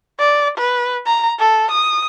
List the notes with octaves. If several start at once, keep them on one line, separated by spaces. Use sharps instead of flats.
D5
B4
A#5
A4
D#6